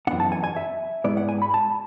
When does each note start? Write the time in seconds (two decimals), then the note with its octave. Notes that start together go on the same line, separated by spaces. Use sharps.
0.07 F#2 E3 B3 D4 F#5
0.20 A5
0.32 G#5
0.44 G#5
0.56 E5
1.04 G#2 G#3 B3 E4 D5
1.17 F#5
1.29 G#5
1.42 B5
1.54 A5